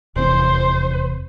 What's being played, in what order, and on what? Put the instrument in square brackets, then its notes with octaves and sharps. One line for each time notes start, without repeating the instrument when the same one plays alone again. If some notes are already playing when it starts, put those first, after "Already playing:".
[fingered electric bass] F1 E2 C3 [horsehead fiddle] C5